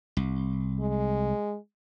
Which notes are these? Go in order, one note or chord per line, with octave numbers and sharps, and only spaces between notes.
C2
G#3